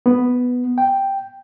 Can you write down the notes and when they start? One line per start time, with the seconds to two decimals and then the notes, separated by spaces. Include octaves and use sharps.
0.06 B3
0.78 G5